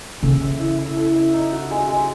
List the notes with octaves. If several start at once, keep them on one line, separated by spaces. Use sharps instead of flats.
C#3 A4
E5
E4
E4
A4
E5
D#4
F#4
G#3
G#3